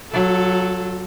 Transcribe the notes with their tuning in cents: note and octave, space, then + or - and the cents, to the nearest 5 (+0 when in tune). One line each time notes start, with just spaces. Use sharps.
F#3 +0 F4 +40 A4 +0